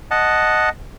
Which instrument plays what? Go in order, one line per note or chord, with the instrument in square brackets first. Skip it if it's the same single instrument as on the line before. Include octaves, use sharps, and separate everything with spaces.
[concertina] D#5 F#5 A5